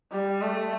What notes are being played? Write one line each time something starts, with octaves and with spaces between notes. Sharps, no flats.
G3
A3